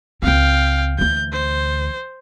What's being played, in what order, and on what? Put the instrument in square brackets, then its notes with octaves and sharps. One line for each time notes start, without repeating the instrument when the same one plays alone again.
[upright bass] C#2 C4 [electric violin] F5 G5
[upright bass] D2 E3 [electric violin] G6
[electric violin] C5